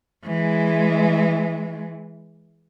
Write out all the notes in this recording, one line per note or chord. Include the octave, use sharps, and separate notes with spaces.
E3 G#3